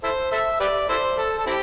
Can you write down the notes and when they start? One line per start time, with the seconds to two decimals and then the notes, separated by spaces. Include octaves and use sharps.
0.03 E4 A4 C5
0.32 A4 C5 E5
0.60 G4 B4 D5
0.89 E4 A4 C5
1.18 A4
1.39 A4
1.46 C4 E4 G4